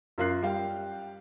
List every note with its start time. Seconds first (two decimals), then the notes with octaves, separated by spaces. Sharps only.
0.18 F#2 F4 A#4 F#6 C7
0.43 G3 F5 G5